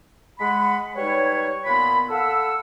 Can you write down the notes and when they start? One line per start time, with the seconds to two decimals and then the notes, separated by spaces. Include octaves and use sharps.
0.40 G#3 F#5 B5
0.96 G3 D#4 B4 C#5
1.65 A#2 B3 F4 B5
2.09 A4 F5 F#5 E6